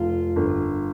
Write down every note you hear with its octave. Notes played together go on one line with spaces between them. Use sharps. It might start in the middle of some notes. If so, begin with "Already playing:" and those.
Already playing: F1 F4
G1